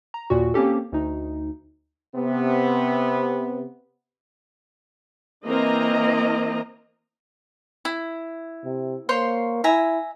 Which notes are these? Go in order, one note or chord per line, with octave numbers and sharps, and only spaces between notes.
A#5
D#2 A#2 F#4
A#3 C4 C#4 G4 A4
D2 D#4
C3 B3
E3 A#3 C4 A#4 D#5 A#5
E4
C3
A#3 C5 C#5 C6
E4 E5 G#5 A#5